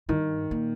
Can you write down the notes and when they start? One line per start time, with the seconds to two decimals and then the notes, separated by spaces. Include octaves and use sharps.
0.09 G2 D#3
0.51 A#2